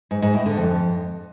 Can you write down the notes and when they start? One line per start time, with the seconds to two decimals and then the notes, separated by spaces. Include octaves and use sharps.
0.11 G#2
0.22 G#2
0.34 A2
0.46 D3
0.57 F2